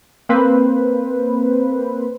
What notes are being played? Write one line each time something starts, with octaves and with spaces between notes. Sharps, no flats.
A#3 C4 B4 C5